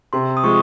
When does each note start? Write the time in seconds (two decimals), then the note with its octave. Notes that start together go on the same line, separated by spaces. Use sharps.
0.13 C3 C6
0.37 D#6
0.43 F3 G#3 C#6